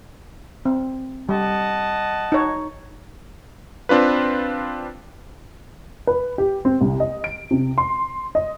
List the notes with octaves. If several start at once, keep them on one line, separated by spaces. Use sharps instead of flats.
C4
G3 D#5 F#5 A5
D#4 C#5
C4 D4 F4 B4
B4
G4
C4
C2
D#5
D7
C3
C6
D#5